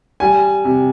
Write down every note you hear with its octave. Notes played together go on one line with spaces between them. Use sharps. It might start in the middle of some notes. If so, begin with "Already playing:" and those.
G3 G#5
C3